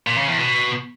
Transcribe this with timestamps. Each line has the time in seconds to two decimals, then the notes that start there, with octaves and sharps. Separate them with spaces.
0.07 A#2
0.17 C#3
0.28 E2
0.38 B2